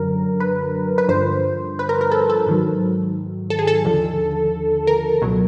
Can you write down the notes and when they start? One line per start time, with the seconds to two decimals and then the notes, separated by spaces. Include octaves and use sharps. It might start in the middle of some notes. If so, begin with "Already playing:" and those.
Already playing: F#2 D3 F#3 A#4
0.40 B4
0.98 B4
1.09 G2 D3 F3 C5
1.79 B4
1.89 A#4
2.01 A#4
2.11 A4
2.30 A4
2.46 G#2 D#3 F#3
3.50 A4
3.59 G#4
3.67 A4
3.85 D#2 D3 F3
4.87 A#4
5.21 C#2 B2 F#3